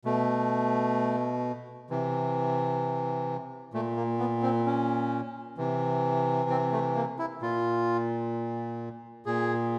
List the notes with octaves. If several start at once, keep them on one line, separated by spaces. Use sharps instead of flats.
B2 A3
C3 E3
A#2 A3
A#3
B3
C4
C#4
C3 E3
C4
A3
A#3
E4
A#2 F4
A#2 G#4